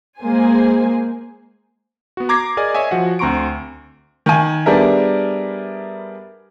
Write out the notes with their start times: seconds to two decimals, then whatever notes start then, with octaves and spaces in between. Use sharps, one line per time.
0.20 G#3 A#3 G#4 C5 G#5
2.17 B3 F#4
2.29 A#5 D6 G#6 A#6 C7
2.57 G#4 A#4 D5 D#5 G#5
2.74 C#5 D#5 E5 G#5
2.91 F3 F#4 F#5
3.19 D2 C4 A#5 C6 C#6 D7
4.26 D#3 G#5
4.66 G3 B3 D4 G#4 A#4 E5